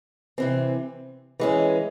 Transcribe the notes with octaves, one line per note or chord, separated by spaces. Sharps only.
C3 E3 C4
E3 G#3 C#4